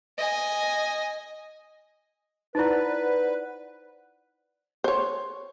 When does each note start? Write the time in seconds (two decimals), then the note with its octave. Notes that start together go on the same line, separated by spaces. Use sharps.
0.18 D#5 G#5
2.55 D#4 E4 B4 C5 D5 F#5
4.84 C5 C#5